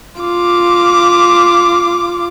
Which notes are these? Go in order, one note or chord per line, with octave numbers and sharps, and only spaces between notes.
F4 D6